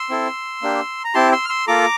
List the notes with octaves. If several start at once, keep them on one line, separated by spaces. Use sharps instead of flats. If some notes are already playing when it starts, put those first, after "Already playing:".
Already playing: C6 E6
C4 E4 A4
A#3 D4 G4
A#5
C4 E4 G4 A5 C6
C6 E6
F6
C6 E6
A#3 F4 A4 A#5 D6